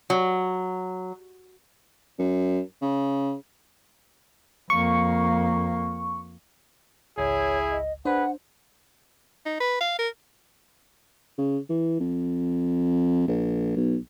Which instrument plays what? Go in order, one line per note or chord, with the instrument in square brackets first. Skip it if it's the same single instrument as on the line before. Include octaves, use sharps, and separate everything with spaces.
[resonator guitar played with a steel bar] F#3
[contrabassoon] F#2
C#3
[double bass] F2 A#3 [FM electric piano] C#6
[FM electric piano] G#1 C#2 [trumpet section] E4 G#4 [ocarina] C#5
[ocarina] D#5
[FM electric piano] D4 C5 [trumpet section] G#4 B4 [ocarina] F#5
[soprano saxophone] D#4
B4
F5
A#4
[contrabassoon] C#3
E3
F2
A#1
B1